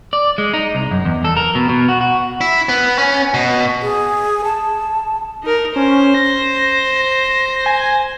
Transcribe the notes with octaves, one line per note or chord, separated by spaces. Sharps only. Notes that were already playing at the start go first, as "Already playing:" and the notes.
D5
G#3
D#4
C2
F#2
E2
A4
A#4
B2
B2
F#4
F#4
E4
B3
C#4
B2
G#4
A5
D#4 A#4
C#4 C5
A#6
G#5